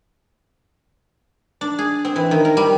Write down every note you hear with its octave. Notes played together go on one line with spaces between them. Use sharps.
D4
G#4
C4
E3
D#3
A#4
G3